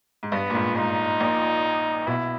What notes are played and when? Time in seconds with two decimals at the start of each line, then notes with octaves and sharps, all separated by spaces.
0.23 G#2
0.32 G2 B3
0.50 A#2
0.55 G#2
0.76 G#2 D#4
1.20 A#1 A#2
2.07 B1 B2 E4